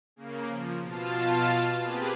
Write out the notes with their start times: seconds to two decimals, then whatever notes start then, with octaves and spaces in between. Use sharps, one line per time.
0.16 C#3 A#3
0.46 F3
0.83 B2 F4 F5 A5
1.83 A#3 C4 G4 G#4 B4